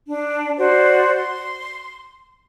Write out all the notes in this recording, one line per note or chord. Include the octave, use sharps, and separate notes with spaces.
D4
F#4 C5 D5
C6